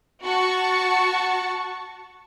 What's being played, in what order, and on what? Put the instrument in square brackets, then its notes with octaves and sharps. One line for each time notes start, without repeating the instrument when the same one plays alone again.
[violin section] F#4 A5 C#6